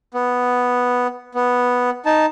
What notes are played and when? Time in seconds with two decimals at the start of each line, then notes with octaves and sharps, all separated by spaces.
0.14 B3
1.35 B3
2.06 D#4 A5